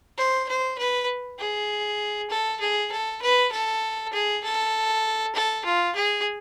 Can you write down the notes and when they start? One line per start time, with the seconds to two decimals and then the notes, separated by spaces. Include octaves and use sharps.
0.18 C5
0.48 C5
0.78 B4
1.39 G#4
2.30 A4
2.61 G#4
2.91 A4
3.22 B4
3.52 A4
4.13 G#4
4.44 A4
5.35 A4
5.65 F4
5.95 G#4